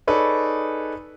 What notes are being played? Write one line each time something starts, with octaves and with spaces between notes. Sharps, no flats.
D#4 G#4 A4 B4 C#5 D5